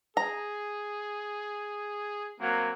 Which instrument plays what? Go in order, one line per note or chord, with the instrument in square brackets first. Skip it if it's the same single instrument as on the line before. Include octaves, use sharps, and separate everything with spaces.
[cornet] G#4 [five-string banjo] A#5
[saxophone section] F#3 A#3 [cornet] C4